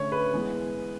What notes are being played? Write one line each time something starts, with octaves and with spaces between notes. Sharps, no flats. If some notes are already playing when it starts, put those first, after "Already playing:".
Already playing: D3 A3 C#4 C#5
B4
E3 G#3 B3